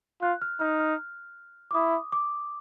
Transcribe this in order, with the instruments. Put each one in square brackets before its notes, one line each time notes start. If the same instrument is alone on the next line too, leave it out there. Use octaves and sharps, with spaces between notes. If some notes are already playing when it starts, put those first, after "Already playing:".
[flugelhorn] F4 [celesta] F#6
[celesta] F6
[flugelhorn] D#4 [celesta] F6
[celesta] F6
D6
[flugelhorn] E4 [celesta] D#6
[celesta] D6